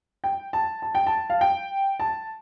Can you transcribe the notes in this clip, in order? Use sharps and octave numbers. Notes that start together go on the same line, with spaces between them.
G5
A5
A5
G5
A5
F5
G5
A5